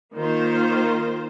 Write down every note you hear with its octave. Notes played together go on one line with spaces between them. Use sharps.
D#3 A#3 F4 C5